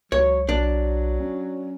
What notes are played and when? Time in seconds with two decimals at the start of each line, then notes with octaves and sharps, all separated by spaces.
0.12 C#2 F#3 C#5
0.49 B1 F#3 D4
1.20 C#4